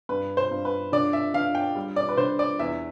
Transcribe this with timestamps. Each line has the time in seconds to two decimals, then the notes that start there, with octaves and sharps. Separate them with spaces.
0.09 G2 B4
0.37 C5
0.51 G2
0.65 B4
0.92 D3 D5
1.13 E5
1.34 D3 F5
1.55 G5
1.76 G3
1.96 D5
2.09 B4
2.17 D3 C5
2.39 D5
2.59 E2 E5